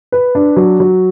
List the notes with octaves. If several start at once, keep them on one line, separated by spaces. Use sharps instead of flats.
B4
D4
F#3
F#3